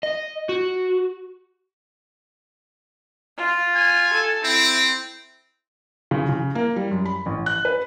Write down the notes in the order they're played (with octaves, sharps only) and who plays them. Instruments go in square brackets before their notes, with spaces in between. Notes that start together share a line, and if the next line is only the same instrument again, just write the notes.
[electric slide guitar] D#5
F#4
[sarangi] F4
[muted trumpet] G#5
[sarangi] A4
[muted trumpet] C4 [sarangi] E4
[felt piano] C#3
C#3
A#3
G3
F#2
B5
A1
F#6
B4